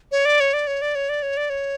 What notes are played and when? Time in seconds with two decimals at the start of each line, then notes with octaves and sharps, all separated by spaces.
0.12 C#5
0.25 D5
0.40 C#5
0.53 D5
0.67 C#5
0.82 D5
0.95 C#5
1.09 D5
1.22 C#5
1.37 D5
1.50 C#5